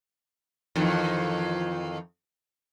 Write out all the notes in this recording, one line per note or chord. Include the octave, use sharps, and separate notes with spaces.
F2 D#3 E3